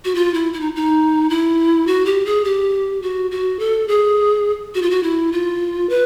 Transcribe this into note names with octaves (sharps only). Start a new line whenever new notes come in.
F#4
F4
E4
E4
D#4
D#4
E4
F#4
G4
G#4
G4
F#4
F#4
A4
G#4
F#4
F4
F#4
E4
F4
B4